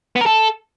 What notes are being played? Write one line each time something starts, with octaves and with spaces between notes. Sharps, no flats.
B3
A#4
A4